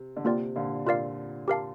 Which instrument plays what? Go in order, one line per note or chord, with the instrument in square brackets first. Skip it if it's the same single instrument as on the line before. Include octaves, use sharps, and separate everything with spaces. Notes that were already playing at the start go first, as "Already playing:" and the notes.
Already playing: [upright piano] C3
D3
[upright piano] C3 [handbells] A#3 F4 A#4 D5 G5
[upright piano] A#2 D3
[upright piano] A#2 [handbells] F4 A#4 D5 F5
[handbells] G4 A#4 F5 A5